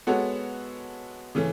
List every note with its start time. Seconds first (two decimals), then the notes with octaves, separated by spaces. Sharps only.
0.07 G#3 B3 F#4 A4 C#5
1.35 C#3 E3 A3 C#4